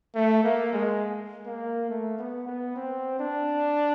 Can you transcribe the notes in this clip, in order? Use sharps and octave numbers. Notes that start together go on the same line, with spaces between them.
A3
A#3
G#3
A#3
A3
B3
B3
C4
D4